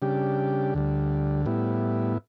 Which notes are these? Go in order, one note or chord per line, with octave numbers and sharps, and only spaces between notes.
C#3 G3 D4 G4
D2 D3 G3
A2 G3 B3 E4